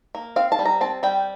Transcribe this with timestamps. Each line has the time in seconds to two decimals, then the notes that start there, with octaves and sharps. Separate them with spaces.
0.15 A#3
0.36 C4 F5
0.52 A5
0.59 G3
0.65 A#5
0.81 C4 A5
1.03 G3 G5